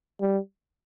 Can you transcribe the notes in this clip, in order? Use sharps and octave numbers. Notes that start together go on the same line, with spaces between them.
G3